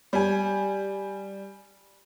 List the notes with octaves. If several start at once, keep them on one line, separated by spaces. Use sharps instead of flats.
G3 G#5